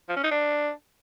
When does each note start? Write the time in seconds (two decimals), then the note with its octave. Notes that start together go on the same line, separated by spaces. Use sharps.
0.09 F3
0.16 C#4
0.24 D#4
0.31 D4